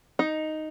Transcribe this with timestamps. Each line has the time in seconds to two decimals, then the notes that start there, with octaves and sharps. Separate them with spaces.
0.19 D#4